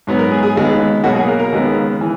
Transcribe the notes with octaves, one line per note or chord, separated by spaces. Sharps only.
G#2 F#3 B3
A#4
G#4
G#4
D#2 C#3 G#3 B3
B2 F#3 A#3 F#4
G#4
A#4
A#4
D#2 C#3 G#3 B3
E3